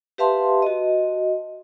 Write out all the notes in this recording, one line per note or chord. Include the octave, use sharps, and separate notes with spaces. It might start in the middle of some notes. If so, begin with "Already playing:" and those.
G4 B4 E5 F5 A5 C6
F#4 D#5